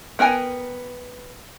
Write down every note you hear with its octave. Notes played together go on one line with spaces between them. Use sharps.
B3 A#4 G5 G#5